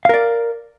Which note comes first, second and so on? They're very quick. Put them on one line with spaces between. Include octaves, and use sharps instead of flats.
F5 A#4 D5